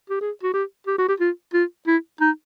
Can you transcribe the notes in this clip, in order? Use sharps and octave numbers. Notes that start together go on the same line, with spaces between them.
G4
G#4
F#4
G4
G4
F#4
G4
F4
F4
E4
D#4